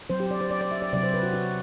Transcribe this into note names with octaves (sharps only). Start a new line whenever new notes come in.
F#3 C4 C5
G4
D5
C5
D5
D5
E5
D5
C3 F#3 C4 D5
C5
B4
F#4
F#4